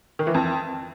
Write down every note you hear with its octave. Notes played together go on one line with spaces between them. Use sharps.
D#3
E3
F2